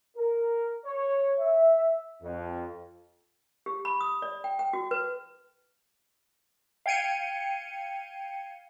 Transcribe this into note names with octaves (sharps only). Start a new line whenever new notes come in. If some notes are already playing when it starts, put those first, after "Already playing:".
A#4
C#5
E5
F2
G4
B5
D#6
D5
G5
G5
F#4
B4
F5 G5 G#6 C#7 D#7